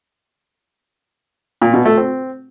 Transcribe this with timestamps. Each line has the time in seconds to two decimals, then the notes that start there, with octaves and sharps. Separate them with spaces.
1.62 A#2
1.73 B2
1.85 A3
1.97 C4